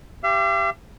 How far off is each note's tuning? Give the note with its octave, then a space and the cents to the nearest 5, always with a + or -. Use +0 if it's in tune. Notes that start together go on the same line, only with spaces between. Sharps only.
G4 +0 F5 -45